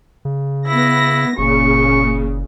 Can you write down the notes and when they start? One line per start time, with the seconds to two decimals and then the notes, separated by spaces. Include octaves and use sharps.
0.25 C#3
0.67 B3 E4 A#6
1.38 F#1 A#2 C#3 C#6